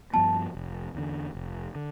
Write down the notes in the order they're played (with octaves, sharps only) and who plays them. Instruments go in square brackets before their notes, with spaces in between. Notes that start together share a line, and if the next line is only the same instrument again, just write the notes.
[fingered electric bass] G2 F3 B3 [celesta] A5
[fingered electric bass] F1
E2 D3
F1
D3